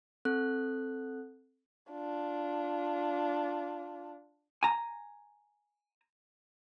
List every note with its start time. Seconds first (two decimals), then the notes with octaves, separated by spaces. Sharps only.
0.25 C4 A4 F#6
1.92 D4 F4
4.63 G#5 A#5